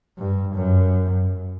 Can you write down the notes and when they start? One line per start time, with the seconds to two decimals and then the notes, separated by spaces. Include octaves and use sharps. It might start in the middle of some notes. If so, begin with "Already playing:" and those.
0.18 G2
0.55 F#2